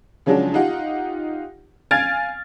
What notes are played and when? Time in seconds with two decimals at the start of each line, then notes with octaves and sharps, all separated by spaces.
0.26 C#3 F3 F#3 G#3 D4
0.54 D#4 F4 G4 F#5
1.91 F5 G#5 F6 G#6 A6 D7